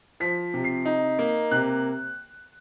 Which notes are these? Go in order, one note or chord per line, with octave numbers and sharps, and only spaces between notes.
F3 B6
C3
C7
D#4
A#3
C3 F#6